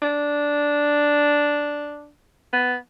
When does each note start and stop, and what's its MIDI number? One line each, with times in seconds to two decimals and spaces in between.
0.02 2.10 62
2.53 2.75 59